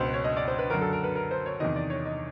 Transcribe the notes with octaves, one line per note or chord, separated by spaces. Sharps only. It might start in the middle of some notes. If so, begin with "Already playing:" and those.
Already playing: C#2 B2 C5
C#5
D#5
D5
C5
B4
F#2 D3 A#4
A4
A#4
B4
A#4
C5
C#5
E2 C3 D#3 D#5
D5
C#5
D#5